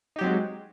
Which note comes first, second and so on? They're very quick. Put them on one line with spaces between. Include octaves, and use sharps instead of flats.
D#4 G4 F#3 C4 G#3